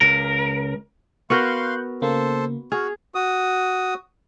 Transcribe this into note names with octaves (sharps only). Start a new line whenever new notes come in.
C#2 A#4
B3 F#4 A#4 F5 C6 C#6 F#6 G6
C#3 A#3 A4 C5
F#4 G#4 F6
F#4 D#6